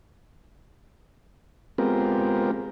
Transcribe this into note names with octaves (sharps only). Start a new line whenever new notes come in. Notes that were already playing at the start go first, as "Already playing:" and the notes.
G#3 B3 C4 F4 G4 A#4